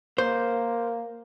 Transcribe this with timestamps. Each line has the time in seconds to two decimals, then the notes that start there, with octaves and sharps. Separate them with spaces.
0.18 A#3 C5